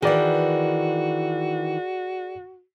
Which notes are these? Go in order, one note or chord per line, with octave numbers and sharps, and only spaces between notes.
D#3 E3 F#4 G#4 D5